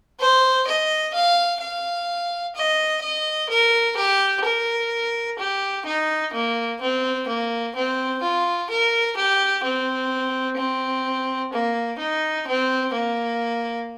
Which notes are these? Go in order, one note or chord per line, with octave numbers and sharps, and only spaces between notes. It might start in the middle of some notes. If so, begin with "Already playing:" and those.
C5
D#5
F5
F5
D#5
D#5
A#4
G4
A#4
G4
D#4
A#3
C4
A#3
C4
F4
A#4
G4
C4
C4
A#3
D#4
C4
A#3